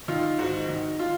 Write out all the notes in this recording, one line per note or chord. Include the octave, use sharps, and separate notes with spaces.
D#3 F4
G#2 F#4
D#3
F4